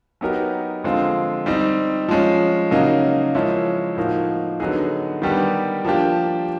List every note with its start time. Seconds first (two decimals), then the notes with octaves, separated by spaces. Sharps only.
0.21 F#3 B3 D#4 G4 A#4
0.84 D3 F3 G#3 C4 F4
1.46 G3 C4 D#4
2.08 F3 G#3 C#4
2.71 C#3 F#3 A#3 D#4
3.35 F3 G#3 C#4 E4
3.97 A2 F3 A#3 D#4 F#4
4.60 D3 F#3 B3 D#4 G#4
5.22 D#3 G3 B3 D4 G4
5.85 F3 A#3 D4 G4